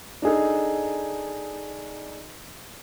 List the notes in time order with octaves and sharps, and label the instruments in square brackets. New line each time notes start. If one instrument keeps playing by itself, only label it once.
[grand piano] D4 D#4 G#4 A4